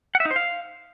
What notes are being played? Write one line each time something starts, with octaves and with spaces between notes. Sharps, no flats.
F#5
E5
D#4
C5
F5